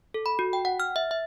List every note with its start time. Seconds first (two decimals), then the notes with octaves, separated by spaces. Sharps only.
0.14 A4
0.26 B5
0.39 F#4
0.53 G5
0.65 F#5
0.80 F6
0.96 E5
1.11 E5